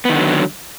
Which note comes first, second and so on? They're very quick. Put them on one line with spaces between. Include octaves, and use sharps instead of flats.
B3 D#3 D3 F#3